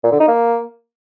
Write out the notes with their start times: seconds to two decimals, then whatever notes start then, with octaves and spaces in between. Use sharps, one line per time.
0.04 A#2
0.12 D3
0.20 D#4
0.28 A#3